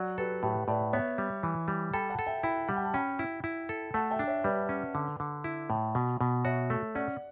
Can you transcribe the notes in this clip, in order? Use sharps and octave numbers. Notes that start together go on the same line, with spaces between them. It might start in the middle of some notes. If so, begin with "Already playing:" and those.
Already playing: F#3 D5 F#5
G4 A4 B4
A2 G4 B4
A2 B4 D5
B3 C#5 E5
G3
E3
G3
A4 G5 B5
F#5 A5
A4
E5 G5
E4 G5 B5
G3 F#5
G5
A5
C#4 G5 B5
E4
E4
A4
A3 F#5 A5
E5 G5
D4
C#5 E5
G3 B4 D5
C#4
D3
D3
E4
A2
B2
B2
F#4 C#5 E5
A3
C#4 D5 F#5